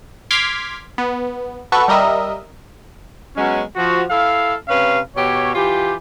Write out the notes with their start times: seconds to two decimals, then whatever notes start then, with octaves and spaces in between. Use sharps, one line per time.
0.31 C6 D6 F6 G#6 B6
0.98 B3
1.72 F#4 A4 B4 C#6
1.88 G3 A#4 D#5 E5
3.36 F#3 G#3 B3 C#4
3.75 F3 F#4
4.10 E4 A4 F5
4.68 C3 C#4 B4 F5
5.16 B2 G4 C#5
5.54 E3 F4 G4